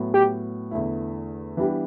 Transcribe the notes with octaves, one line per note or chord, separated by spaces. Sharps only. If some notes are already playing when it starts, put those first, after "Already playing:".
Already playing: A2 F#3 B3
G4
E2 D3 A3 E4
E3 G3 B3 D4 G4